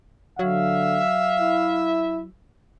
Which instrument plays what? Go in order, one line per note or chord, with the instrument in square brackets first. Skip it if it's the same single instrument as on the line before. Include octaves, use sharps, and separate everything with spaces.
[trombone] D3 [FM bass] F#3 [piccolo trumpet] E5 [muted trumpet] F5
[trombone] E4